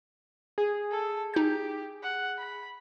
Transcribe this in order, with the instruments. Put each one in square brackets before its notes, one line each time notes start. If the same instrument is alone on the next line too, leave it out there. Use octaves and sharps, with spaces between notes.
[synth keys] G#4
[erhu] A4
[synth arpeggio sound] D#4 G6 [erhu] G4
[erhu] F#5
B5